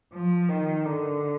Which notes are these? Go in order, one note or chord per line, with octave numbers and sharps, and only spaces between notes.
F3
D#3
D3